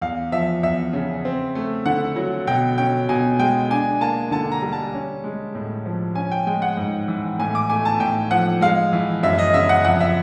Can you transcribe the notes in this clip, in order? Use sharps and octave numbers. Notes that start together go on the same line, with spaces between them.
E2 F5
F3 E5
E2 E5
C#3
C4
A3
D3 F#5
F#3
B2 G5
C#4 G5
B2 G#5
G#3 G5
D4 G#5
A#3 A5
D3 A5
A#5
G3
A5
C#4
G#3
A2
F3
C#4 G#5
G5
G#3 G5
F#5
G#2
E3
A2 G#5
D6
A3 G#5
A5
A2 G5
F3 F#5
G#3 F5
E3
F#2 E5
D#5
C#3 E5
F#5
F2 F#5
E5